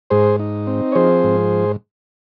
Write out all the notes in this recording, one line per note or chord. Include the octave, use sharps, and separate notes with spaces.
G#2 G#4 C5
D#4
C4
C#5
F3 G#4 C5
G#2